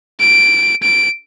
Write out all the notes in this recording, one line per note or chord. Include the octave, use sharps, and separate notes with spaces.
D7
D7